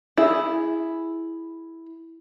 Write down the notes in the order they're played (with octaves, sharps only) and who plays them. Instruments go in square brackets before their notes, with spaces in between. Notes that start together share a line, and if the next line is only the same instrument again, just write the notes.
[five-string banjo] E4 G#4